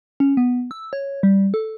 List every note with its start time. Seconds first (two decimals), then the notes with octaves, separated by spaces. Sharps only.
0.20 C#4
0.37 B3
0.71 E6
0.93 C#5
1.23 G3
1.54 A4